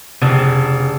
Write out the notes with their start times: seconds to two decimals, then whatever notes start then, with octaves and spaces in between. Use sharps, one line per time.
0.21 F1 C#3 D4